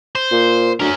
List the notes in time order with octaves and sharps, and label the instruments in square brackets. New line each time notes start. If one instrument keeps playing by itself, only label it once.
[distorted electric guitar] C5
[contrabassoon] A#2
[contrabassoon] D2 [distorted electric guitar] C#4 A#4